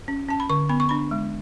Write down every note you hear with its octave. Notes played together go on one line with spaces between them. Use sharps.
C#4
C#4 A5
B5
D3 C#6
B3 B5
C#6
D4 B5
G#3